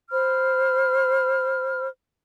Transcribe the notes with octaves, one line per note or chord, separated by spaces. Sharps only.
C5 B5 F6